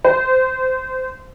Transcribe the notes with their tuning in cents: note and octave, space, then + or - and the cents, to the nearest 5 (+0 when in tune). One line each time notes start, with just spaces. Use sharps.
C5 -20